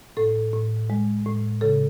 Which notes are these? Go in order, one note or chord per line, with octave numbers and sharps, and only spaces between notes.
A2 A4
A2
G#3
A2
C#3 A4